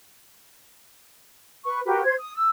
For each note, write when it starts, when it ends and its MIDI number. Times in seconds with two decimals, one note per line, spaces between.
1.64 1.80 71
1.64 1.80 85
1.85 2.01 66
1.85 2.01 67
1.85 2.01 70
1.85 2.01 71
2.03 2.14 72
2.03 2.14 92
2.17 2.33 87
2.35 2.50 88